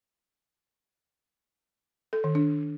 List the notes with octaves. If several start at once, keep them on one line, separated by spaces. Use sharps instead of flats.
A4
D#3
D4